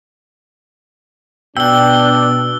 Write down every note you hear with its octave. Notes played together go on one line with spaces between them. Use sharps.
B2 D4 G5 E6 G7